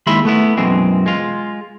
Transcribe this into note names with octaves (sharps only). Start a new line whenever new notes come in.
D#2 G#3 E4 E5 B5 C6
A3 B3 E4
F#2 B2 E3 G#3 C4
G#3 F4